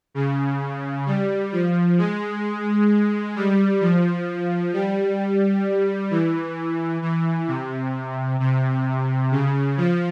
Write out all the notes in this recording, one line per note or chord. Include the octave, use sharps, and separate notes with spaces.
C#3
G3
F3
G#3
G3
F3
G3
E3
E3
C3
C3
C#3
F3